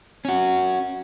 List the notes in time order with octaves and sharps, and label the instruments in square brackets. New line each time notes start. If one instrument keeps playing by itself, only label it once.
[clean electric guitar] C#4 F#4